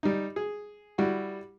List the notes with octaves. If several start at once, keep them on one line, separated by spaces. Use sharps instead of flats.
G3 D#4
G#4
G3 E4 F#4